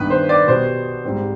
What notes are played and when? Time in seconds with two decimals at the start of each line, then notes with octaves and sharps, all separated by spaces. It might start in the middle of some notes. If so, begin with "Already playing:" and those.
Already playing: G2 D#3 B3 B4
0.10 C5
0.29 D5
0.47 B2 G3 B3 C5
1.04 G#2 G3 C4